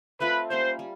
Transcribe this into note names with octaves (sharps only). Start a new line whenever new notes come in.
A3 C4 F4 B4
G3 A#3 C#4 C5
G3